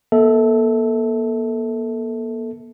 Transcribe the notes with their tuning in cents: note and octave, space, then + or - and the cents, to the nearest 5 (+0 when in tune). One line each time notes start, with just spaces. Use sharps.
A#3 +45 A4 +0 E5 -30